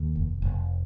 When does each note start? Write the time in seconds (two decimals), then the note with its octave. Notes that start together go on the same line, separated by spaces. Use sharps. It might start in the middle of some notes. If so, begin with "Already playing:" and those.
Already playing: D#2
0.16 F1
0.42 F1